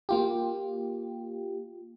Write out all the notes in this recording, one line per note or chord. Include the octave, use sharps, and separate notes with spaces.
A#3 F4 G4